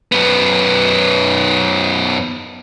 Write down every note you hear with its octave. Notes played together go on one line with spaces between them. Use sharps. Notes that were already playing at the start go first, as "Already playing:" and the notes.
F#2 B3